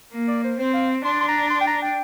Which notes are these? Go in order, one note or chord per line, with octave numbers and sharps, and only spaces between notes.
A#3
D5
C5
C4 C5
F5
D4 C6
C6
A#5
C6
G5
A#5
G5